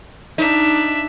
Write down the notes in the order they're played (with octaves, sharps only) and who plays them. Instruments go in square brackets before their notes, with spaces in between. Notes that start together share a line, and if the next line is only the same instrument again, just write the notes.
[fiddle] D4 E5 [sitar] D#4